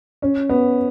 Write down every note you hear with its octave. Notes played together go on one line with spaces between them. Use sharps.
C#4
B3